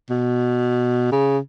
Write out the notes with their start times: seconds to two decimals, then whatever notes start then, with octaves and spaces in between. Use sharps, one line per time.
0.10 B2
1.12 C#3